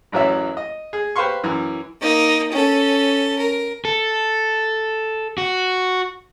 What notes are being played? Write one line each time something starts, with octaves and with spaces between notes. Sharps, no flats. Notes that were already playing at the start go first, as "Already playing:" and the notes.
A1 F#2 E3 F#3 C#4 E5
D#5
G#4
G4 B4 C5 F5 C6 C#6
F#2 E3
A#3 D#4
C#4 A4
A#4
A4
F#4